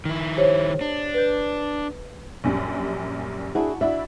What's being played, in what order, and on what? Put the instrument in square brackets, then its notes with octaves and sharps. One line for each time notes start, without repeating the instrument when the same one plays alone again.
[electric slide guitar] D#3 E4
[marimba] G4 C5 C#5
[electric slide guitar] D4
[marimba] B4 G6
[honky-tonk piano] A#1 F#2 G3
[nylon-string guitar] D4 E4 G#4 [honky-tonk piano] F#4
[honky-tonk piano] D4 E4 F#4 [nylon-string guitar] E5